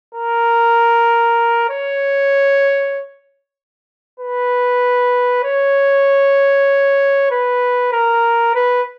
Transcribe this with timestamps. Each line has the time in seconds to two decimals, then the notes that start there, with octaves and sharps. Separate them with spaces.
0.14 A#4
1.70 C#5
4.19 B4
5.44 C#5
7.31 B4
7.93 A#4
8.55 B4